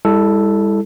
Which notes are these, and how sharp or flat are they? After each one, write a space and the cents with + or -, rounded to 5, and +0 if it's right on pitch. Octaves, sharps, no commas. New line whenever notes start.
G3 +45 E4 +0 A4 +0